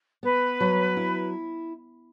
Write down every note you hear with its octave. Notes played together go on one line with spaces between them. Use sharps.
B3 B4
F#3
E4